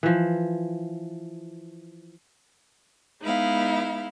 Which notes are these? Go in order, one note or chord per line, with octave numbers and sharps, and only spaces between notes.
E3 F3
G#3 B3 D#4 E4 F5